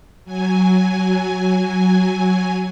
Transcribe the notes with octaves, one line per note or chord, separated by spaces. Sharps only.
F#3 G#5